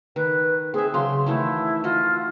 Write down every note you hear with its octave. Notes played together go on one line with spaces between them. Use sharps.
D#3 B4
C4 G#4 E5
C#3 F#3 C6
D#3 E3 A3 E4
F4 F#4 D#5